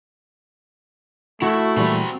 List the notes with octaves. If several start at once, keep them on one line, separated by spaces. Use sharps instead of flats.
A3 E4 F#4
A#2 E3 G3 C4 B5